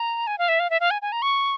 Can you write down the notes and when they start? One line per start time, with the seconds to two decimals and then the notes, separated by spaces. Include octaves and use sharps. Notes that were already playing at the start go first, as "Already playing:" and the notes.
Already playing: A#5
0.27 G#5
0.38 F5
0.48 E5
0.60 F5
0.70 E5
0.80 F5
0.91 G#5
1.02 G#5
1.12 A#5
1.22 C#6